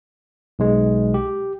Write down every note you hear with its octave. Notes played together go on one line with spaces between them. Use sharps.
B1 G#3
G4